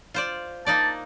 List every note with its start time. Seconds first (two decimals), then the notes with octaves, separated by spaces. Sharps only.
0.14 F4 C5 D5
0.66 A#3 D#4 D5 A5